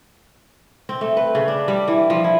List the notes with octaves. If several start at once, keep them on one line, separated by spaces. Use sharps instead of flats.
C4
A3
B4
C#3
D4
G3
E3
F3
E4